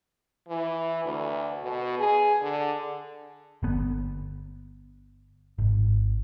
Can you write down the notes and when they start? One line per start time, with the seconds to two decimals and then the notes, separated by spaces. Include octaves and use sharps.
0.49 E3
1.05 D2
1.63 B2
1.99 G#4
2.42 D3
3.63 G1 B3
5.58 G#1